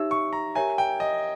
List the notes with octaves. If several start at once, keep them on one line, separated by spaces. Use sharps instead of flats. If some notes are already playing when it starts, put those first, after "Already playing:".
Already playing: D#4 G4 C#5 E5 E6
C#6
A#5
G4 A#4 C#5 E5 G#5 A#5
G5
D#5